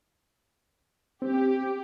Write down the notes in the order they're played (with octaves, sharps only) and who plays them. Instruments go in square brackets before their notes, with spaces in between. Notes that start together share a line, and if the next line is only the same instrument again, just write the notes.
[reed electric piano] C4 [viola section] G4